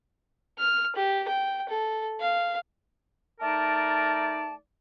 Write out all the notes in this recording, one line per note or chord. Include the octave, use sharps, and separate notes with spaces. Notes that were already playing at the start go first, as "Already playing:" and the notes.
F6
G4
G5
A4
F5
A3 D#4 A#4 D5 A5